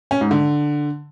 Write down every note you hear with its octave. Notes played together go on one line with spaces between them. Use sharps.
C#4
G#2
D3